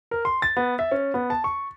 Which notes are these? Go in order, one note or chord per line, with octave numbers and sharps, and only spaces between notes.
A#4
C6
A6
B3
E5
C#4
B3
A5
C#6